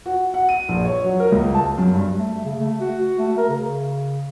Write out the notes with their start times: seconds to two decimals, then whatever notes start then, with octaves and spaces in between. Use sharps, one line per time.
0.06 F#4
0.34 F#5
0.49 D#7
0.69 A#1
0.85 C#5
1.04 F#3
1.20 A#4
1.32 C#2
1.55 A5
1.78 F#2
1.93 G2
2.18 A3
2.45 C#3
2.60 A3
2.80 F#4
3.18 A3
3.37 A#4
3.49 C#3